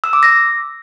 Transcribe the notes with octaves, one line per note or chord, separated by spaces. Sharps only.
E6
D6
A#6